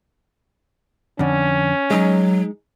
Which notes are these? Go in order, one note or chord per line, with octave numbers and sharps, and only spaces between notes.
F2 D3 C#4
F#3 G#3 D#4